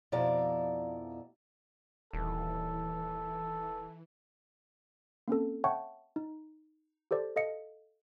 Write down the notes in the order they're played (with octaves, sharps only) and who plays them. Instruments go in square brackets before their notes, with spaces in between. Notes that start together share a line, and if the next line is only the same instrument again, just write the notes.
[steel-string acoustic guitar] F2 B2 F3 E4 D5 A#5
[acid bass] D#1 [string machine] E3 [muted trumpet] A4
[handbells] A#3 C4 C#4 A4
C#5 E5 F#5 G5 A5 C#6
D#4
G4 A4 C5 D5
A4 D#5 F5 C#7